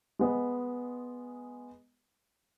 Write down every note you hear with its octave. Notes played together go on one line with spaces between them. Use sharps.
G#3 B3